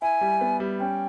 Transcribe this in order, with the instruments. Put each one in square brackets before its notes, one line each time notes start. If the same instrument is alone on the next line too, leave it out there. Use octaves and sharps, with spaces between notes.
[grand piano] E4 [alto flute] G#5
[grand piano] G3
B3
G3
[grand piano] C#4 [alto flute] G5